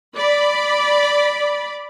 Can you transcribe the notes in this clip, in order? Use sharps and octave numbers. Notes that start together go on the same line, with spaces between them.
D5 B5